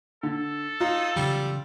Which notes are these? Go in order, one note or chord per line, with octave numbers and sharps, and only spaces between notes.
D3 A4
D#4 F4
C#3 E3 F#3 G3